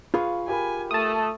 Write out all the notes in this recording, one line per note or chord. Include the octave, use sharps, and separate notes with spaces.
F4 G#4 B4 F5 C#6
G4 A#4 G#5 B5
A3 A5 D#6